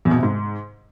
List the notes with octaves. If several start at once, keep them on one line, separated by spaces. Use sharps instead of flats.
E2
B2
C3
G#2